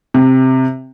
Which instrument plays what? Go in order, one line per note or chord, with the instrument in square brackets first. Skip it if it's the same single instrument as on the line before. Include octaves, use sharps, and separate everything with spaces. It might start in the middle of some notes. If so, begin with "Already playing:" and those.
[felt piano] C3